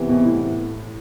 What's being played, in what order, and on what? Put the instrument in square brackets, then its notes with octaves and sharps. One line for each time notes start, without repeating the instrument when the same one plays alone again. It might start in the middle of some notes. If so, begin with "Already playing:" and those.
Already playing: [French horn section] E2 C3 E3 B3
[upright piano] B2
A2